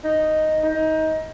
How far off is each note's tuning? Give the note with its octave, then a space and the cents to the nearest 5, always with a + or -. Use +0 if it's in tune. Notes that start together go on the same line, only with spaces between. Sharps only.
D#4 +0
D#4 +20